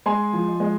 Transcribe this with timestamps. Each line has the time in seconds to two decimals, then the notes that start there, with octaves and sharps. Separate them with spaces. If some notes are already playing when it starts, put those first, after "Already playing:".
0.06 G#3 G#5 C6
0.33 F3
0.60 G#3